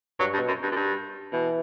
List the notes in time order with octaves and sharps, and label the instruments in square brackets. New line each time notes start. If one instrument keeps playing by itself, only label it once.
[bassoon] G2 [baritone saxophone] F#3
[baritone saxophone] G2
[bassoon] B2
[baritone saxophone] F#2
G2
F#2
G2
[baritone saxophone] B2 [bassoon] E3